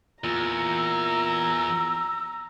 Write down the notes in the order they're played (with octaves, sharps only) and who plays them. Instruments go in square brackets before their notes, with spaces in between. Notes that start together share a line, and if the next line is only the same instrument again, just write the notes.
[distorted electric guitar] E2 [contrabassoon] A#2 [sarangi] A#5 [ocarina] E6